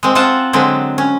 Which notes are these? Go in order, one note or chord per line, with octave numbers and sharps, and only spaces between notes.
G#3 C4
C4 F4 F#5 A5
D3 F#3 G#3 C4
C#4